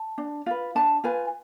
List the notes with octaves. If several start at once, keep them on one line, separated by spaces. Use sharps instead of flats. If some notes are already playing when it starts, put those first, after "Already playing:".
Already playing: A5
D4
F4 B4
D4 A5
F4 B4 G#5